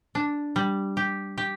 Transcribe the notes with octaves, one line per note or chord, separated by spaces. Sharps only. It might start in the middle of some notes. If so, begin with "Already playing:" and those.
D4
G3
G4
G4